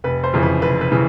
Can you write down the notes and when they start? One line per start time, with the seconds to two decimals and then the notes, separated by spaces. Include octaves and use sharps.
0.04 F1 B4
0.24 C5
0.33 F2 C#3 E3
0.43 B4
0.62 F1 B4
0.81 B4
0.92 C#3 E3